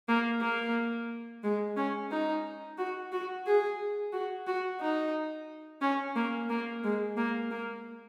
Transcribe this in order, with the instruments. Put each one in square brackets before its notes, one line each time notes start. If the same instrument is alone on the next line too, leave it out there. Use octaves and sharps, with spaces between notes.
[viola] A#3
A#3
G#3
C#4
D#4
F#4
F#4
G#4
F#4
F#4
D#4
C#4
A#3
A#3
G#3
A#3
A#3